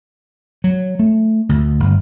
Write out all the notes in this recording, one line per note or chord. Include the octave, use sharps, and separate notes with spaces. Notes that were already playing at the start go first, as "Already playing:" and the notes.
F#3
A3
D2
G1